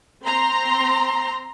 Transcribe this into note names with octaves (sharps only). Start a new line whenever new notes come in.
C4 A#5 C6